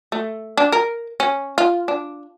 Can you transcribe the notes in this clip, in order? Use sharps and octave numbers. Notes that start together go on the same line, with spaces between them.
A3
D4
A#4
C#4
F4
D4